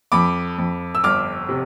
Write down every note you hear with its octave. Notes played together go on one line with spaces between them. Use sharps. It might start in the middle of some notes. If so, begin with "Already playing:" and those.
F2 B5 D6
F2
E6
G1 D6 F6
C3